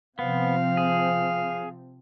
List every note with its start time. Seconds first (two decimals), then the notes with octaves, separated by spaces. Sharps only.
0.19 C3 F3 B3 C4 F5
0.77 G#4